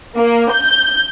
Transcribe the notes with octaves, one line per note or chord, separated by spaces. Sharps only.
A#3
G6